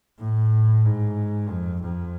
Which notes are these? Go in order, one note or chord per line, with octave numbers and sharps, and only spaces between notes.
A2
G#2
F2
F2